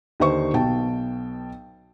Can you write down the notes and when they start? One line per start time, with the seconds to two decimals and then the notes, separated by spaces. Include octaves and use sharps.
0.20 D#2 D3 D#4 C5 C#6
0.53 B1 B2 G5 A5